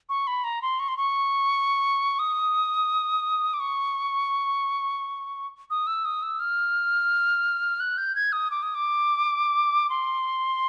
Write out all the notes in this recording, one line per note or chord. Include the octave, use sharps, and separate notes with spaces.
C#6
B5
A#5
C6
C#6
C6
C#6
D#6
D6
C#6
D#6
E6
D#6
E6
F6
F#6
G6
G#6
D#6
D6
D#6
D6
C6